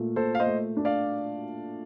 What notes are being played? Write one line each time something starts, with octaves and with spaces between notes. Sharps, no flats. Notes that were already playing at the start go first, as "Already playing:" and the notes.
Already playing: A#2 A3
A#2 A4 C5
F5
C5 D#5
A3
D4
D5 F5